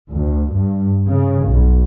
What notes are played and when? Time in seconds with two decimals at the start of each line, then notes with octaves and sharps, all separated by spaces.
0.11 D2
0.52 G2
1.06 C#3
1.47 B1